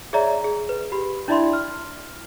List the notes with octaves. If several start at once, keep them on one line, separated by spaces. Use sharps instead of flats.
G#4 C#5 D5 E5 A#5
G#4
B4
G4 B5
D4 E4 D5 E5 B5 C6
F6